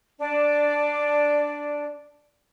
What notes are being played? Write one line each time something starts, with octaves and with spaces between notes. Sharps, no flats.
D4 D5